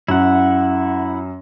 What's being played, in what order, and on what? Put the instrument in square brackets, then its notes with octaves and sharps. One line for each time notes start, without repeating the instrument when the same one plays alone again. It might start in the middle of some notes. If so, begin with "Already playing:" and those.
[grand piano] F#2 [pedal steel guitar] E4 F#5